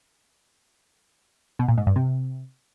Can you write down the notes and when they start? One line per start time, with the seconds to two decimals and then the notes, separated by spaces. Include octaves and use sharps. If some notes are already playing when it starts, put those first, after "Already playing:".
1.59 B2
1.68 A#2
1.78 G#2
1.87 G2
1.96 C3